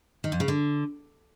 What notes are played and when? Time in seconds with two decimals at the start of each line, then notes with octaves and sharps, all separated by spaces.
0.24 D#3
0.32 F2
0.40 C#3
0.48 D3